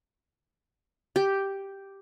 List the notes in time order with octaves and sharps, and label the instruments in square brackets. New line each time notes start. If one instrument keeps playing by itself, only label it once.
[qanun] G4